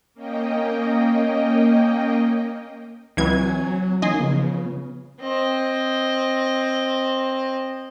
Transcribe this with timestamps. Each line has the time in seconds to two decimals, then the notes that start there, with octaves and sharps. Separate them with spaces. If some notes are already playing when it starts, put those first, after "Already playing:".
0.14 A#3 C#4 D#5 G5
3.17 C#2 E3 F#3 C4 G#5 G#6
4.02 E3 A#3 C#4 D#4 D#5 G#5 C6
4.20 C#3 F3 B3
5.21 C4 D#5